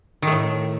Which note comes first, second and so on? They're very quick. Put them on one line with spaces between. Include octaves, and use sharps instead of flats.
D#3 A3 A2